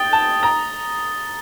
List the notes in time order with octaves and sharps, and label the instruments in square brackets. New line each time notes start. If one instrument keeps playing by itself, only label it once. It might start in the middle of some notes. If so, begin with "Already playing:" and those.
Already playing: [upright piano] G5 [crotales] D#6 A6 G7
[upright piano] A5
A#5